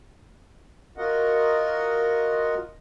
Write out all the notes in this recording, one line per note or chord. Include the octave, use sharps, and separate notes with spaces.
F4 F#4 A#4 D#5 F#5